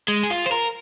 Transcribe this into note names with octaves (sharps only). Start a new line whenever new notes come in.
G#3
G#4
F4
C5
A#4